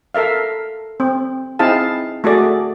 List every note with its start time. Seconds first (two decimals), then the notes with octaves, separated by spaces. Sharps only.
0.15 A4 A#4 E5 F5
1.00 C4
1.59 C4 D#4 E4 G#4 F5 A5
2.24 A3 F#4 G#4 D5